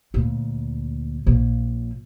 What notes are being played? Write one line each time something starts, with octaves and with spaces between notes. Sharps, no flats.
D2 A#2
A#1 A#2